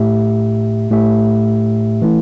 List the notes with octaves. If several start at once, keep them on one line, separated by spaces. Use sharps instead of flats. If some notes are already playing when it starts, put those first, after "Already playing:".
Already playing: A2 A3 G4 E5
A2 A3 G4 E5
E3 A3 E4